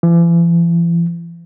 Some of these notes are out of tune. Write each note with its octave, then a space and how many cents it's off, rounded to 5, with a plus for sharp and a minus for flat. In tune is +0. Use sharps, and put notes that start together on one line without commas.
E3 +45